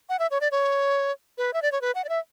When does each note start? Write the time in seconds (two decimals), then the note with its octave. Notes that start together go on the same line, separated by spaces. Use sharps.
0.09 F#5
0.19 E5
0.31 C#5
0.41 D5
0.52 C#5
1.38 B4
1.54 E5
1.62 D5
1.72 C#5
1.81 B4
1.95 F#5
2.05 D5
2.09 E5